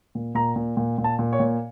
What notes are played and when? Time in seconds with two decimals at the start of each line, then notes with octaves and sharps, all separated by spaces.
0.15 A#2
0.35 A#2 A#5
0.56 A#2
0.77 A#2
0.98 A#2
1.04 A5
1.19 A#2
1.33 C#5
1.40 A#2